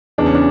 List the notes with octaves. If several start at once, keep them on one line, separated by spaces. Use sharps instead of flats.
E2 C#3 E3 D4
C#4
D4